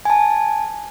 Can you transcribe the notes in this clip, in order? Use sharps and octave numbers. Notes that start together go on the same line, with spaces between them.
G#5 A5